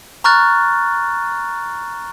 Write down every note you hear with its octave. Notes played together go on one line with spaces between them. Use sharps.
A#5 C#6 F6 F#6 A6